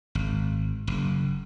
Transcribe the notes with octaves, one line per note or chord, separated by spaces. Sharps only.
G#1
F#1